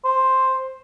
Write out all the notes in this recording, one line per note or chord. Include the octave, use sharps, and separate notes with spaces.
C5